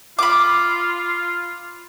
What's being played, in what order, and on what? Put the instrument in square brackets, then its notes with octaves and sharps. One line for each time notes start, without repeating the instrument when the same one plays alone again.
[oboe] F4 [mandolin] B5 D6